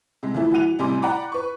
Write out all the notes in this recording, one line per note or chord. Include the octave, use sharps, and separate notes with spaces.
C3 G#3
E3 F3 A3 E4
E3 F#3 F#5 D#7 F7
A1 C3 G3 G#5 C6 D6
D5 F#5 G5 A#5 B5 D6
B4 C#6